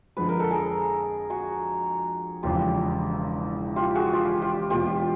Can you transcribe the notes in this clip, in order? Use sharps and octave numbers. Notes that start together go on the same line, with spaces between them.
F2 D3 F3 G#3 B4
A#4
A4
G#4 A#4
F#4 G#4
E1 E2 C#3 F3 F4 G4
F4 G4
F#4 G#4
F4 G4
F4 G4
E1 E2 B2 F4 G4